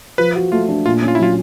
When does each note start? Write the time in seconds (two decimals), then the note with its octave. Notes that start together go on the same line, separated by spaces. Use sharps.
0.18 F3 B4
0.36 F#4
0.52 A3 F4
0.69 D4
0.86 A#2 F4
1.03 C#4
1.08 F4
1.15 E4
1.19 F#3 F4